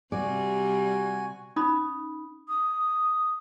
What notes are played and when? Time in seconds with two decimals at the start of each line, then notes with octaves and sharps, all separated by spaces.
0.12 C3 G3 F#4 D5 G#5
1.56 C#4 D#4 B5 D#6
2.48 D#6